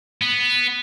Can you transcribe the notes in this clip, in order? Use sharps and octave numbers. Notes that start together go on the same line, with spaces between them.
B3